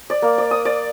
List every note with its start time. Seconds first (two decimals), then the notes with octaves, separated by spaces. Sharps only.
0.10 D5
0.22 A#3
0.38 D5
0.51 D#6
0.65 D5